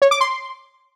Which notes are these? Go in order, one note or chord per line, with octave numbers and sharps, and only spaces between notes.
C#5
D6
C6